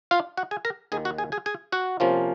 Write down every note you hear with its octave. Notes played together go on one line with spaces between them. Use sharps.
F4 F5
F#4 F#5
G#4 G#5
A#4 A#5
D#2 D#3 A#3 G#4 G#5
F#4 F#5
G#4 G#5
G#4 G#5
G#4 G#5
F#4 F#5
C3 F3 A#3 C#4 F4